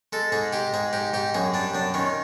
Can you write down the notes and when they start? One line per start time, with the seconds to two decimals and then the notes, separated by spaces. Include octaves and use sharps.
0.13 G#3 A4
0.32 G#2 G#4
0.53 G#3 G4
0.74 G#2 G#4
0.93 G#2 G4
1.13 G#2 G4
1.35 F#2 G#4
1.54 G3 D4
1.74 F#2 D4
1.94 D#3 C#4